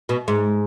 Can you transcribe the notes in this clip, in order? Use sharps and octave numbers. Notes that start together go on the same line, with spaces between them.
B2
G#2